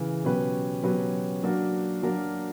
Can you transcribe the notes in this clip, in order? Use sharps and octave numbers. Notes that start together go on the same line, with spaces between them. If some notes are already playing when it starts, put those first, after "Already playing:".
Already playing: C#3 E3
B2 F#3 C#4 G4 B4
B2 F#3 C#4 G4 B4
F#3 A#3 D4 F#4 A#4
F#3 A#3 D4 F#4 A#4